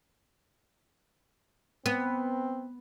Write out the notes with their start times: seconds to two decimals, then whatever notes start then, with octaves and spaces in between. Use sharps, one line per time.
1.86 B3 C4